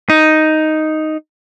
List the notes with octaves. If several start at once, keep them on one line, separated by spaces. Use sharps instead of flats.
D#4